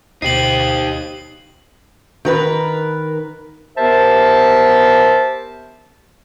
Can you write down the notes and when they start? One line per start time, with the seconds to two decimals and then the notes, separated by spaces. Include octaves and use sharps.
0.22 D2 B2 D#4 G4 C5 C7 F#7
2.25 D#3 A#4 B4
3.77 B3 G4 A#4 C5 E5 A5